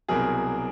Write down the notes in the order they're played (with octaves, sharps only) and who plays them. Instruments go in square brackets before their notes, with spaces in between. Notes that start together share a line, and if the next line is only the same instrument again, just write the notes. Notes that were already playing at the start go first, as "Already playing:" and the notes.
[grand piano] C2 B2 F#3 G#4 A#4